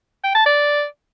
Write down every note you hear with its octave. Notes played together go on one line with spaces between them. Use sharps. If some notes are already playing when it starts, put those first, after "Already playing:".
G5
A5
D5